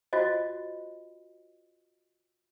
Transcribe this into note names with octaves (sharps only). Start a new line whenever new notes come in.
F4 F#4 C5 D#5